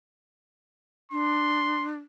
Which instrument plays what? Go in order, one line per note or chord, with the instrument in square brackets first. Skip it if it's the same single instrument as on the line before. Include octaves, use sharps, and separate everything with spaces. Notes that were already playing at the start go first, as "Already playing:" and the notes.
[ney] D4 [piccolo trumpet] C6